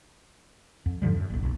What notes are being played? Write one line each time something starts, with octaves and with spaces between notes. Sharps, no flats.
F2
G#2 D3 F3 G3
F#2
F#1 B1
B1